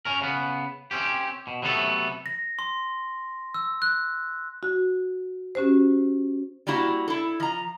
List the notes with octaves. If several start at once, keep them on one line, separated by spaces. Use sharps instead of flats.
C#4 A#4
C#3 B3
C4 C#4 G4
B2
C3 F#3 A3 B3 G#4 A4
A#6
C6
E6
F#6
F#4
C#4 F#4 G4 C5
G3 A#3 E4 F#4 F5
E4 A4
F3 A#5